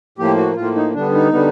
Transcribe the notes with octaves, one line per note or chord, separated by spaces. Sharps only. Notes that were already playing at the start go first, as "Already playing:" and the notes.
A2 F3 A#3 G4
F#4
A2 F3 A#3 F4
D#4
D3 G3 B3 D4
D#4
D3 G3 B3